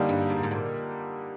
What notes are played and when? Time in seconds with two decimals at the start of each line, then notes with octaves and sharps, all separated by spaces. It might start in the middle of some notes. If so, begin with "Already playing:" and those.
Already playing: D3 G3 A#3 D#4 G4
0.09 G2
0.30 G#2
0.43 G#2
0.51 A#2